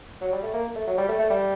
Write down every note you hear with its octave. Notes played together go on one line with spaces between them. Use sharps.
F#3
G3
A3
A#3
A3
F#3
G3
A3
A3
G3